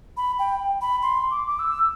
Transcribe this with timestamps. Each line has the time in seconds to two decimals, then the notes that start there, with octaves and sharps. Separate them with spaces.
0.17 B5
0.39 G5
0.81 B5
1.02 C6
1.31 D6
1.47 D6
1.59 E6